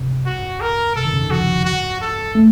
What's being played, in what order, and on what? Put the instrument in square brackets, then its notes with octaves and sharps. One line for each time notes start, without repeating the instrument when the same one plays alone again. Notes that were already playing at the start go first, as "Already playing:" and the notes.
Already playing: [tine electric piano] C3
[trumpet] F#4
A#4
[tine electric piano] C3 [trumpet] A4
[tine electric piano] D#3
C#3
D#3
[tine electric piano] F3 [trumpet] F#4
[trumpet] F#4
A4
[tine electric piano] A3